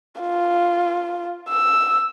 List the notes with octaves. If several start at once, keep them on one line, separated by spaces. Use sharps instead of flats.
F4
E6